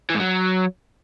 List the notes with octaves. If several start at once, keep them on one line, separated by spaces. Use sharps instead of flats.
E3
G#2
F#3